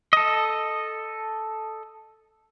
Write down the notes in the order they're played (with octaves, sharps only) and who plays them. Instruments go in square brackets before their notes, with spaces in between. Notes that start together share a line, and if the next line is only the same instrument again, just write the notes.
[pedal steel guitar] A4 D#5